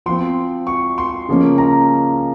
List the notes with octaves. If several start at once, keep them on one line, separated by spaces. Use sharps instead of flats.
F3 C4 C6
C#6
C6
C#3 F3 A#3 C#4
A#5